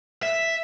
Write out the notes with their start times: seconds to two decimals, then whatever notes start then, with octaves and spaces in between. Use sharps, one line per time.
0.23 E5